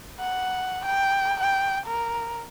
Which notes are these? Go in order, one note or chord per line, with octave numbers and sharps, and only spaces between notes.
F#5
G5
G5
A#4